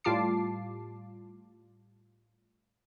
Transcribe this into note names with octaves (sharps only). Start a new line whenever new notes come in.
A2 G3 F4 A5 D6 C7